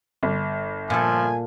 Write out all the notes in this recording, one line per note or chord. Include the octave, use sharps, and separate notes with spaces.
G1
A#2 F3 A4 G#5